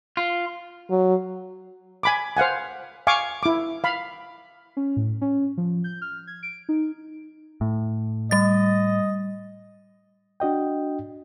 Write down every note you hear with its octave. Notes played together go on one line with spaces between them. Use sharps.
F4
F#3
G#5 B5 D6
C5 F5 F#5 G#5
F5 G#5 C#6 D6
E4 D6
F5 B5
C#4
A2
C#4
F3
G6
F6
G#6
D7
D#4
A2
G3 D#5 A6
D4 F#4 D#5 G5